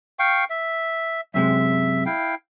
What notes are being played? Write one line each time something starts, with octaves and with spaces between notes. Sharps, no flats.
F5 G5 C#6
E5
F#2 C3 G#3 E5
E4 F5 G5